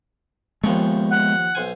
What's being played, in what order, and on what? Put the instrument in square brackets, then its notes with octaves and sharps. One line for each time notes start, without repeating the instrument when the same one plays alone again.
[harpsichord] D#2 F3 C#6 [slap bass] G#3 B3
[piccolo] F#5
[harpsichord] B1 C5 G#5